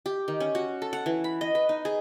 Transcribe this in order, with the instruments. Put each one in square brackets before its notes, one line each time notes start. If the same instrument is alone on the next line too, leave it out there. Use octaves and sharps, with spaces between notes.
[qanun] G4
D#3
C#4
F#4
A4
F#5
E3
B5
D#5
B4
D#4
G#4